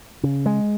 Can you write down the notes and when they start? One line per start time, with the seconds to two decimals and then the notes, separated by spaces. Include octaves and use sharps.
0.23 C#3
0.46 G#3